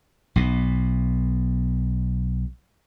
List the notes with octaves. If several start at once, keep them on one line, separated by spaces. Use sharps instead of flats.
B1 B2